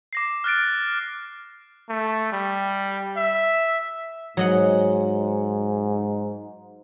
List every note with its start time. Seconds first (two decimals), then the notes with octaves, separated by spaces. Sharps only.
0.13 D6 A#6 C7
0.44 F6 F#6 A6 D7
1.89 A3
2.32 G3
3.17 E5
4.37 G#2 F#3 D#5 F#5